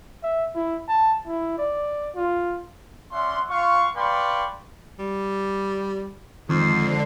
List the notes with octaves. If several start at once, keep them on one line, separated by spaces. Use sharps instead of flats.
E5
E4
A5
E4
D5
F4
C#4 D5 E5 F#5 C6
F4 F5 F#5 C#6
B4 D5 F5 G5 C6 C#6
G3
F2 D3 D#3 G#3 C5